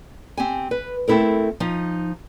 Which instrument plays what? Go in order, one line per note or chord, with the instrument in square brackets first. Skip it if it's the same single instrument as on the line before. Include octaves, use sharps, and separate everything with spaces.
[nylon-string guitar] C4 G4 G#5
B4
A3 C4 E4 A4 A#4
F3 D#4